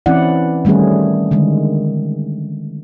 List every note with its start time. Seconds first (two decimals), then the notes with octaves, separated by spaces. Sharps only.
0.06 E3 C4 C#4 E4 D5 F#5
0.65 D#3 G3 A3 C#4 G#4
1.31 D3 D#3 G#3